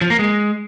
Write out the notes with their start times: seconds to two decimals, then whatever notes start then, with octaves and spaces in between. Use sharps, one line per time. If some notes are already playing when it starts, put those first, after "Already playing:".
0.01 F3
0.10 A#3
0.19 G#3